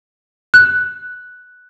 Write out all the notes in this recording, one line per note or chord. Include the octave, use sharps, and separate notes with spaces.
F#6